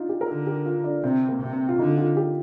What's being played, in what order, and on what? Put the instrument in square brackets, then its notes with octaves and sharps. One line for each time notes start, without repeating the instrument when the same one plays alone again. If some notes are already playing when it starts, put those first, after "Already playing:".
Already playing: [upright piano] D4 D#4 F4
G4
A#4
[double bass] D3 [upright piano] A4
[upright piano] G4
F4
D4
[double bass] C3 [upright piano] C4
[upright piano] A#3
[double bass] C3
[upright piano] C4
F4
[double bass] D3 [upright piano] D#4
[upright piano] F4
G4